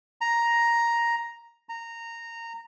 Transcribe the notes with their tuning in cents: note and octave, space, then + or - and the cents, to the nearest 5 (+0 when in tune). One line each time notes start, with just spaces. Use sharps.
A#5 +5
A#5 -15